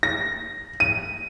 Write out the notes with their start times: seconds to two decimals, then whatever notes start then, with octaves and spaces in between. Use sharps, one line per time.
0.03 A#6
0.80 D#7